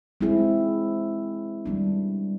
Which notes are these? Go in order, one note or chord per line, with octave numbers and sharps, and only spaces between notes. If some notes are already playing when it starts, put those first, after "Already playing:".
G#3 C4 E4 G#4
D#3 G3 B3 D4